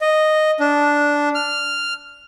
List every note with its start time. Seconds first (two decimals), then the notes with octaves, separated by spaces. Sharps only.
0.01 D#5
0.60 D4
1.35 F6